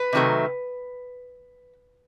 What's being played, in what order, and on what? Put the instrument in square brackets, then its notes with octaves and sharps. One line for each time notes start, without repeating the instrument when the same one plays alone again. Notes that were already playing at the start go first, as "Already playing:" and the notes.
Already playing: [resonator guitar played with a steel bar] B4
C3 D#3 F#3 A3